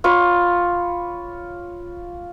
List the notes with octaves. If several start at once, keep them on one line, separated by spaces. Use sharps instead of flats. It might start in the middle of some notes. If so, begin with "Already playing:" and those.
F4 C#5 B5